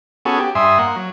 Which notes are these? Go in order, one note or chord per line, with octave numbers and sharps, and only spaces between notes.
B3 C#4 F#4 G#4 A4
G4
G2 E5 G#5 C6 D#6
A#3 F#5
F#3